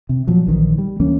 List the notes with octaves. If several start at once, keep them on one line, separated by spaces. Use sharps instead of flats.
C3
A#2 F3 F#3
A#1 D#3 E3
G3
D2 E3 A#3 C#4